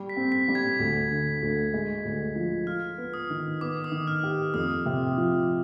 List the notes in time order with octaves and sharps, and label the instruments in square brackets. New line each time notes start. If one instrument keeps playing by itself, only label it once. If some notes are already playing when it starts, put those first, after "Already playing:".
Already playing: [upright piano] G3
[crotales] B6
[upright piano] C4
[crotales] B6
[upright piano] G3
[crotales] G#6
[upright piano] D2
D3
D2
G#3
D2
F3
[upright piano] F4 [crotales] F6
[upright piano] B3
[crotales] D#6
[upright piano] D#3
[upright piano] B3 [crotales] D6
[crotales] D#6
[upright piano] D#3
[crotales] F6
[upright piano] G4
[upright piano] F2 [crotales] D#6
[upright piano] C3
F3